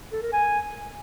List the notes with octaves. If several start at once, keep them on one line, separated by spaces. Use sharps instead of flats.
A4
A#4
G#5